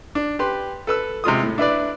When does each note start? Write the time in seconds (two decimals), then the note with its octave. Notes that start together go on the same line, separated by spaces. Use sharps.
0.15 D4
0.39 G4 B4 C6
0.87 A4 B4 E6
1.24 C3 G#3 F4 D#6
1.43 A2
1.58 D4 E4 B4 D5